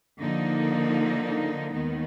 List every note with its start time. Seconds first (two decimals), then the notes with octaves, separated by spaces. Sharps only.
0.20 D3 F3 A#3 D#4
1.74 D#2 D#3 G#3 B3 D#4